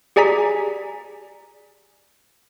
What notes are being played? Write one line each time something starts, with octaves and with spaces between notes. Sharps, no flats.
G4 G#4 D5 G#5 A#5 B6